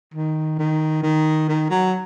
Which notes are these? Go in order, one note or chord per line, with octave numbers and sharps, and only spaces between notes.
D#3
D#3
D#3
D#3
F#3